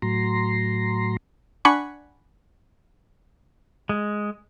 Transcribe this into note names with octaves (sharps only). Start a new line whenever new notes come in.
A2 F#3 A#5 C6
D4 F#5 G#5 B5 C#6
G#3